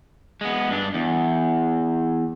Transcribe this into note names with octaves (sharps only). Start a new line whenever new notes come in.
G#3 B3
G2 D4
E2